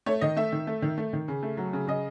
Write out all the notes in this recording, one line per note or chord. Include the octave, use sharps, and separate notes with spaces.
A3 C#5
D#3 D#5
A3 E5
D#3
A3
D#3
A3
D#3
C#3
A3
F#3
C#3
C#3 D#5